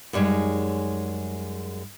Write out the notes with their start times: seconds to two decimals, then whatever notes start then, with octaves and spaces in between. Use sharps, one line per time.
0.13 F#2 G3 G#3 D#4 C#5